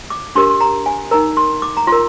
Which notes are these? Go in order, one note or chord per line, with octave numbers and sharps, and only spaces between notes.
D6
D4 G4 A#4 C6
C6
A#5
G#5
D#4 A#4 A#5
C6
D6
A#5
F4 A#4 C6